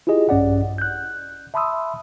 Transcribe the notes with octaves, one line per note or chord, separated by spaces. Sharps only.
E4 F4 G4 G#4 D#5
A#1 G2 C#4 D5 F#5
F#6 G6
E5 A5 B5 C6 D#6 E6